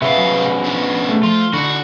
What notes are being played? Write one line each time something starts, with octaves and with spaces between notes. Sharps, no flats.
C2 C#3 B3 E5 F5
F#3
D4 G#4
A3
F3 F4
D3 D4 D#4 F#4 B5